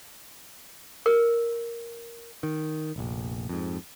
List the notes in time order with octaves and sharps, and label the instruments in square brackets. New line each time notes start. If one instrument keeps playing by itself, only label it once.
[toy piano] A#4
[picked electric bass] D#3
F1 A#1
F2 G#2